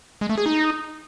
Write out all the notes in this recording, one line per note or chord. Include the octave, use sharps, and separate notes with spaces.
G#3
A3
G#4
D#4